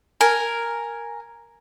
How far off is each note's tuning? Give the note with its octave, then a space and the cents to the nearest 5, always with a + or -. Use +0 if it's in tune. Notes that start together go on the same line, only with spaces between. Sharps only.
A#4 +0 G#5 +0